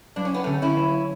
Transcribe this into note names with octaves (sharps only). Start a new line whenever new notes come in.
F#3 D4
C#4
B3
D3 A3 C#4
C#4 E4
F#3